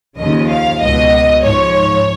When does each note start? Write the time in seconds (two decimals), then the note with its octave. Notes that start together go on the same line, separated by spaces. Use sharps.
0.18 D#2 C#3 F3 D#5
0.49 F5
0.80 C#2 B2 D#5
1.41 G#2 F3 C#5